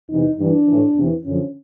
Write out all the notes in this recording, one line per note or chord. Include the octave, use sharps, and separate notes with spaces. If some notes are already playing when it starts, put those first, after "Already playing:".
E2 C3 E3 D#4
G2 E3 D4
A2 E3
E2 C3 E3
F#2 D3 F3 C#4